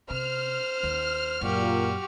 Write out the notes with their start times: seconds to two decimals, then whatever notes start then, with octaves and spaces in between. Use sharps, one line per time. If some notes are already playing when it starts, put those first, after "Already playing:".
0.10 C3 C5 F6
0.83 D#2
1.41 F#2 A#2 F#4 G4